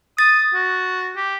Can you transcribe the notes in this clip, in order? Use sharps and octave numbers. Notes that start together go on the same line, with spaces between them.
D#6 A6
F#4
G4